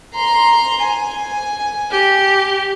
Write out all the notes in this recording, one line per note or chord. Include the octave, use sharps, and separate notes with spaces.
A#5 C6
G#5
G4